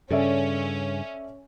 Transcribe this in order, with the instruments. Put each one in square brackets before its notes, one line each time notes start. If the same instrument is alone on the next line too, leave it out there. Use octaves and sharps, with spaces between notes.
[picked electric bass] G2 C#3 [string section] C#4 [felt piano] A4 D5 E5